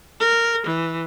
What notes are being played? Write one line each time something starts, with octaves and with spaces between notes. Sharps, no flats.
A#4
E3